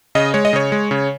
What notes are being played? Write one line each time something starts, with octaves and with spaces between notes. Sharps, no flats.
C#3 D#5
G#3 C#5
D#5
C#3 C#5
G#3
C#3